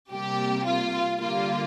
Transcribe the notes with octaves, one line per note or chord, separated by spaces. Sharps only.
C3 G3 A#3 G4
F4
D3 G3 A#3 F4